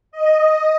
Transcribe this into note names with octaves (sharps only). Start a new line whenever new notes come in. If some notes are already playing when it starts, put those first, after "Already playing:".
D#5